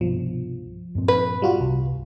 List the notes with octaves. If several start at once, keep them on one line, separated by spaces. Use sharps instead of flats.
C2 G2 B2 F3
G2 A#2 C4
B4
G3 F4 F#4
C2